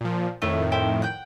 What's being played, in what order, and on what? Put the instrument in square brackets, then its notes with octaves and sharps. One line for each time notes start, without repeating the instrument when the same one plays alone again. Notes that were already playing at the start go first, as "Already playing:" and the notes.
[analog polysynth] A#2 F3
[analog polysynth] F2 A2 D#3 [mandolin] A3
[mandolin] E4 G4 C5
F#5 G5